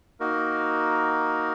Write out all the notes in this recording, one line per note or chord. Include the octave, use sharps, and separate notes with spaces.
A#3 D#4 F#4 A#4